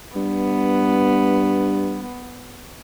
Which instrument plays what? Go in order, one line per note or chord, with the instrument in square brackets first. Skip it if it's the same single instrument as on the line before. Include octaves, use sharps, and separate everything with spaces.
[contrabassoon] G2 [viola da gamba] B3